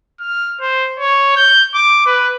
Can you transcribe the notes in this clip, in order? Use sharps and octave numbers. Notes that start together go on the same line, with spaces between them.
F6
C5
C#5
G6
D6
B4